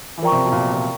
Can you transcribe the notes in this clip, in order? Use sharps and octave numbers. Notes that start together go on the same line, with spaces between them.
E3
F3 A#4 D5 G5 A#5 C#6
C3
B2
A#2
A#2